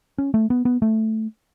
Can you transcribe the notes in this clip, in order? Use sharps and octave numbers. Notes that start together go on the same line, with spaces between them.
C#4
A3
B3
B3
A3